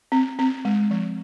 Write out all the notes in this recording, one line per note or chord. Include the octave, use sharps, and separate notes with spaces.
C4
C4
G#3
F3